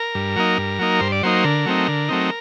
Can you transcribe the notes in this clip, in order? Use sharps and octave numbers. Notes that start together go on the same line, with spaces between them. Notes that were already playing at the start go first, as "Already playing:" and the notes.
Already playing: A#4
G2
F#3 A#3 D#4
G2
F#3 A#3 D#4
G2 C5
D5
F#3 A#3 D#4 C5
D3 A#4
F#3 A3 C4 D#4
D3
F#3 A3 C4 D#4